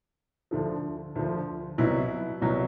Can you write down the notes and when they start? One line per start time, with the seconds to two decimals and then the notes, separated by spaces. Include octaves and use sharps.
0.51 D2 D3 F3
1.15 D2 D3 F3
1.78 C2 B2 F#3 E4
2.42 C2 B2 F#3